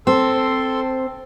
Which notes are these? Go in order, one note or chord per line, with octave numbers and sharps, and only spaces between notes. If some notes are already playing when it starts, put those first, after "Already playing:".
C4 A4 C6